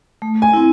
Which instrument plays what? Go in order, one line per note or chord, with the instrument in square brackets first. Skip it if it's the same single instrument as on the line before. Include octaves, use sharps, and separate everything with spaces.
[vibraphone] A3
[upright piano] G#5
[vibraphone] C4 E4